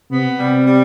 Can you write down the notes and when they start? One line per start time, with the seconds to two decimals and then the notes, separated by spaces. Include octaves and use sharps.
0.11 C3 B3
0.39 C3 G3
0.67 G3